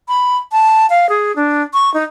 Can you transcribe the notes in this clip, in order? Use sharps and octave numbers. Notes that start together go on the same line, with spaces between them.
B5
A5
F5
G#4
D4
C#6
D#4